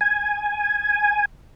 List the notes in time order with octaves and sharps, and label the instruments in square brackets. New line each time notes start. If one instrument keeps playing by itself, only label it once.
[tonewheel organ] G#5